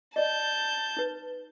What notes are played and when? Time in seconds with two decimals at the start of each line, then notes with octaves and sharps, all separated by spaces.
0.16 D5 D#5 A5 G6
0.97 D#4 B4